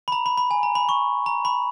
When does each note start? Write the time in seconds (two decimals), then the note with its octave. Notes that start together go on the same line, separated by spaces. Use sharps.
0.08 B5
0.12 A#5
0.26 B5
0.37 B5
0.51 G#5
0.63 A#5
0.75 B5
0.89 C#6
1.26 A#5
1.45 B5